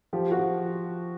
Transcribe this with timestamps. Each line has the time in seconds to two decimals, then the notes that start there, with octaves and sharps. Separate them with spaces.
0.13 F3 G4
0.32 F#4
0.38 F3